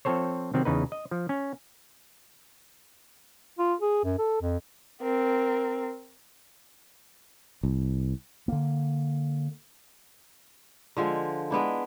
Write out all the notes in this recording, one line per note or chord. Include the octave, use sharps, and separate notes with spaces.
F3 C4 A4 C5 C#5
C3 D#3 F#3 C4
E2 C#3 D#4 B4
D#5
F3
C#4
F4
G#4
F#2
A4
F2
C4 A#4
C2
D3 A#3
D3 F3 G#3
G#3 B3 D4 E4